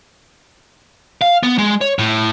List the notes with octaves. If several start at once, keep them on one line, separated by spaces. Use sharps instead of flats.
F5
B3
G#3
C#5
A2